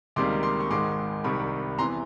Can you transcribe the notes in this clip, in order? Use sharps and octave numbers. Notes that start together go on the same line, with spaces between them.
C#2 C3 D#3 G3 A#3 C6 D6
C6 D6
C#6
G#1 G#2 D#3 G#3 C6 D6
C2 C3 D#3 G3 B5 C#6
E2 C3 E3 A#5 C6